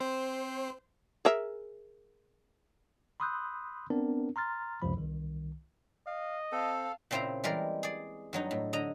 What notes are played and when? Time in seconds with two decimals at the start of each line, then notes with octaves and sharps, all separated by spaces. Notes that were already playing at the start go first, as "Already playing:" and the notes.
0.01 C4 C5
1.25 G#4 A#4 E5
3.20 B5 C6 D#6 E6 F#6 G6
3.90 B3 C4 D4 A#4
4.36 A#5 C6 F6 A6
4.82 C#2 F#2 C3 F3 B5
4.97 C2 D#3
6.07 D#5 F5
6.52 C4 A4 F5 A5
7.11 A#2 C#3 C4 E4 C5 A#5
7.44 E3 G3 G#3 A#4 D5
7.83 G#4 D5
8.33 G2 F#3 D#4
8.51 A2
8.73 D3 D#5 A#5